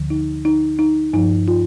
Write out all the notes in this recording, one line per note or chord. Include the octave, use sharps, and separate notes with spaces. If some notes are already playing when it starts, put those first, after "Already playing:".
Already playing: D2 D3 F3
D#4
D#4
D#4
G2 F3 D#4
F4